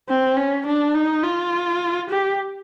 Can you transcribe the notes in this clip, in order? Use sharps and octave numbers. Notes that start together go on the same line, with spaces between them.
C4
C#4
D4
D#4
F4
G4